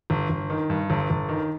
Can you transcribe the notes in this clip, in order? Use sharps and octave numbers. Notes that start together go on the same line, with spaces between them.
G1
G1
D#3
G2
G1
G1
D#3